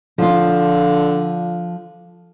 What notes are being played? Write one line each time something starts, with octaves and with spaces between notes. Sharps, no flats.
D3 F3 F4